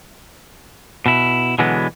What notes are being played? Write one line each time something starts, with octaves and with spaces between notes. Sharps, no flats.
B2 E4
B2 D3 E3 F#3 G#3 B3